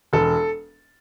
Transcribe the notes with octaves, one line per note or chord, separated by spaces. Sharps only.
E1 A4